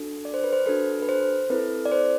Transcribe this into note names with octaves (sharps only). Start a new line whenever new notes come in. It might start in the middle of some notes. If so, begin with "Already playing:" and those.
Already playing: D4 F#4 A4
D5
C5
B4
C5
D4 F#4 A4 B4
B4
C5
C4 E4 A4 B4
D5
C5